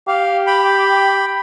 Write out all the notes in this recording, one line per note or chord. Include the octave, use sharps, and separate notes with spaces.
G4 F5
G5 B5